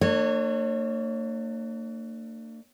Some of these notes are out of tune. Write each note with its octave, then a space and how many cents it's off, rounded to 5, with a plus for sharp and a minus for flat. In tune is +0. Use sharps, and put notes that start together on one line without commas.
A#3 -45 D4 +30 C#5 -20